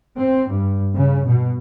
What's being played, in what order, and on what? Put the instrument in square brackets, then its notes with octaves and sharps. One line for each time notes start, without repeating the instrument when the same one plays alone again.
[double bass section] C4
G2
C#3
B2